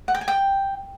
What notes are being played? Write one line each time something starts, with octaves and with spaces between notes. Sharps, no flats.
F#5
G5
G#5
G5